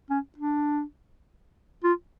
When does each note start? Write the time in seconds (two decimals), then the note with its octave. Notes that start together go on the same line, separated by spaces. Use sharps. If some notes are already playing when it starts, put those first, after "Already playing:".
0.10 C#4
0.38 D4
1.84 F4